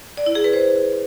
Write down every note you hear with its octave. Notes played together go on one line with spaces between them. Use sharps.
D5
E4
G#4
B4
C5